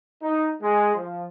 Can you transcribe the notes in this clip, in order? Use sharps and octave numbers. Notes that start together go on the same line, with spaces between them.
D#4
G#3
F3